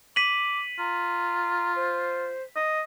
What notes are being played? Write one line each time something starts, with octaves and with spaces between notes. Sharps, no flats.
D6 B6 D#7 F#7
F4 A#5
C5
D#5